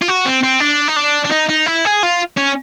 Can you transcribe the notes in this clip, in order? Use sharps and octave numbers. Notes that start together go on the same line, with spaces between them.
F4
F#4
C4
C4
D4
D#4
D4
D4
D#4
D#4
E4
G#4
F4
C#4